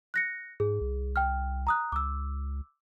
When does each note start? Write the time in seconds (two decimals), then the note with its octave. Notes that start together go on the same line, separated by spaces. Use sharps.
0.14 F#6 A#6 C#7
0.60 G#2 G#4
0.81 C2
1.16 G5 F6
1.67 A#5 D#6 F#6
1.92 C#2 D6 E6